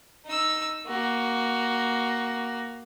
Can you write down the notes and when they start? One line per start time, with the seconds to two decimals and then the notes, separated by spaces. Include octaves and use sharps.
0.26 D#4 E6
0.87 A#3 F#4